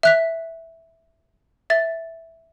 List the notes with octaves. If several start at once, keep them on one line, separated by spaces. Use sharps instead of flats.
E5 F#6 B6
E5 A6